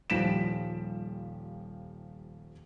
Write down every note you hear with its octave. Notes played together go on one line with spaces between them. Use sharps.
D#1 F3 G3 B6 D7 E7